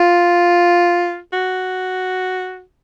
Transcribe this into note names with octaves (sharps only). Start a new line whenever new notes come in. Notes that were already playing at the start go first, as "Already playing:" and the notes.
Already playing: F4
F#4